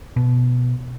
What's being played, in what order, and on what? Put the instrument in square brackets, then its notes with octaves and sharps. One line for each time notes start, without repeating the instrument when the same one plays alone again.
[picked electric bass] B2